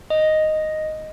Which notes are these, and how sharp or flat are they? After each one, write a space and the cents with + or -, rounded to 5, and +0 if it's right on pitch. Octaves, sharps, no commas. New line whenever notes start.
D#5 +0